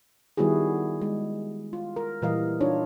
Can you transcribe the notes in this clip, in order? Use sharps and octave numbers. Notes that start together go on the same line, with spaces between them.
D#3 G3 B3 E4 F#4 G#4
G#3
F4
A#4
A#2 E3 G3 A#4 D#5 F5
D4 D#4 F4 C#5